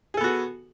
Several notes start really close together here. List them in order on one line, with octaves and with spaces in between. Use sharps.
G#4 A4 B3 F#4